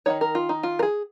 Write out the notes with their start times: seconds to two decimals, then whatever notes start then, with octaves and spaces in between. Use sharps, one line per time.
0.06 A#3 D#4 C#5
0.10 D#3
0.21 A#4
0.35 F4
0.49 D#4
0.63 F4
0.79 A#4
0.83 G#4